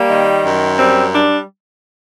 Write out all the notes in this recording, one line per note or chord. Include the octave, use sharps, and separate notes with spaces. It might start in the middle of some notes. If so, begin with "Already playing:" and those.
Already playing: G3 A#3
D#3
F#2
G3 C4
G3 D4